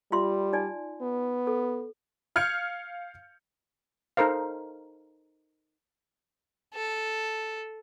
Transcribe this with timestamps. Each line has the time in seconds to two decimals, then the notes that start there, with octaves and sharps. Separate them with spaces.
0.12 G3 F4 E5 C6
0.53 D#4 D5 G#5
1.02 B3
1.47 A4
2.36 F5 F6 G6 G#6 C#7
4.17 D#4 A4 A#4 C5 F5
6.74 A4